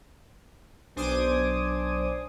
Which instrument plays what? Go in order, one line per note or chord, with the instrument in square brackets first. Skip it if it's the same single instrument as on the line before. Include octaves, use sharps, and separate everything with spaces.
[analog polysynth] B1 D4 C5 G#5 D6 D#6